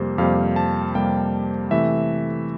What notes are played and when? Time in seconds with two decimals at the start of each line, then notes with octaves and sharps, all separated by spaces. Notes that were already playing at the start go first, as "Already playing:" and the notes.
Already playing: F2 C3 G3 A#3 C5
0.18 F2 C3 G3 A#3 F5
0.56 A5
0.95 F2 C3 G3 A#3 G5
1.71 C3 E3 A3 E5